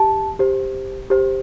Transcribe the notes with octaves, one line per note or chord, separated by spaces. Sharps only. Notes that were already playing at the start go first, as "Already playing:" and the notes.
Already playing: G4 A5
G4 C5
G4 C5